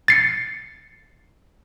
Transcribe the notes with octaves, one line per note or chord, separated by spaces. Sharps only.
A6 C7 C#7